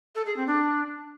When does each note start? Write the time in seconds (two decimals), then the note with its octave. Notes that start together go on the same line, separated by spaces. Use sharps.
0.15 A4
0.26 G#4
0.36 C4
0.47 D4